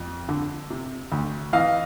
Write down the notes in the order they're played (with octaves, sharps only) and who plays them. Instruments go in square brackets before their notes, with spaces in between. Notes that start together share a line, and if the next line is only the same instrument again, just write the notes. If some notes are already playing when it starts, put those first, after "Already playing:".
Already playing: [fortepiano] F2
D3
C3
D2
[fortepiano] E3 [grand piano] D#5 F5